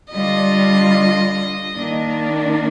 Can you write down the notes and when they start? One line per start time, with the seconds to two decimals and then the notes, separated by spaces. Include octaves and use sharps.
0.11 D3 G3 D4 F4 D#5
1.76 D#3 A#3 D4